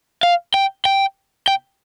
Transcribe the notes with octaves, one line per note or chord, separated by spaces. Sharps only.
F5
G5
G5
G5